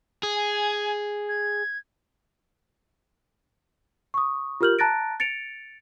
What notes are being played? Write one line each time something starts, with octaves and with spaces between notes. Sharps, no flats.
G#4
G#5
G#6
C#6 D#6
F4 G4 A#4 F6 G6 F#7
A5 A#5 F#6 A6 A#6 D7
A6 C#7 D7 F7